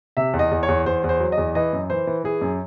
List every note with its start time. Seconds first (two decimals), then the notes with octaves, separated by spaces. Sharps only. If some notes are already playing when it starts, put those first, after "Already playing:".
0.17 C3 E5
0.34 E2
0.39 D#5
0.51 E2
0.63 C#5
0.68 E2
0.86 E2 C5
1.04 E2
1.09 C5
1.20 F#3
1.32 D#5
1.38 E2
1.55 E3 D#5
1.73 F#2
1.90 E3 C5
2.07 E3
2.24 E3 G#4
2.41 F#2